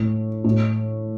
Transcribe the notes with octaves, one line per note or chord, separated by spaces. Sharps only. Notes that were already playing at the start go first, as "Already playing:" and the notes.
Already playing: A2
A2